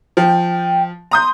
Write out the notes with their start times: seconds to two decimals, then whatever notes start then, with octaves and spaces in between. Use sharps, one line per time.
0.17 F3 G5
1.11 A#5 C6 D#6 G6